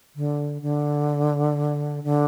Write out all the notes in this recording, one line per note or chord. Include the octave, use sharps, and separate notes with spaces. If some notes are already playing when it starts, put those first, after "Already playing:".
D3
D3
D3